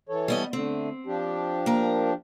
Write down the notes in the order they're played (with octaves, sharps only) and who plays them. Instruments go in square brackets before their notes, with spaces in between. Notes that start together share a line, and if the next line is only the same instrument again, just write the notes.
[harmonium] E3 A4 C#5
[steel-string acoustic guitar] G3 B3 D#5
[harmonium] D3 A3 [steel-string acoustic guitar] C4
[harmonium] F3 D4 G4
[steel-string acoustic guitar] A#3 A#4